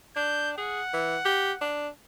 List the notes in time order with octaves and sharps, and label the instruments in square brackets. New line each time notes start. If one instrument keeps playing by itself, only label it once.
[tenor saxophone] D4 [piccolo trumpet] G6
[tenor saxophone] G#4 [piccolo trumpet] F#5
[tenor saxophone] E3
G4
D4